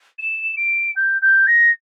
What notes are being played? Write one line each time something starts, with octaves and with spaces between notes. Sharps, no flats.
E7
D7
G6
G6
A#6